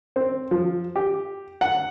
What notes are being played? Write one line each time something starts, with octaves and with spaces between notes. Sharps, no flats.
C4
F3
G4
F#5